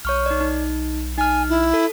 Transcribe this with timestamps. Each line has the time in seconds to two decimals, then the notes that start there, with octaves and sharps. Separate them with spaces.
0.05 B1 C#5 C#6 F6
0.26 D#4 D5
0.41 D#4
1.18 D#4 G#5 F6
1.49 E4
1.74 A4